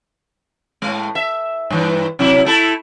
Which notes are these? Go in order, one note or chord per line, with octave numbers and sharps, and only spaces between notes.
A2 G#3
E5
G2 E3
C3 F#3 E4
A3 E4 A4